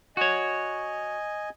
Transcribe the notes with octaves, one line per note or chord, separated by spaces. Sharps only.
F#4 C#5 D#5 G#5